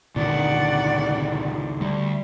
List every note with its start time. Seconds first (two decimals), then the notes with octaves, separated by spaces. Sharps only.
0.16 C#2 A#2 D3 D#3 D5 F#5
1.81 D2 G3